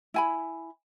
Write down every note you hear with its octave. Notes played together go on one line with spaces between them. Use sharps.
E4 G#5 B5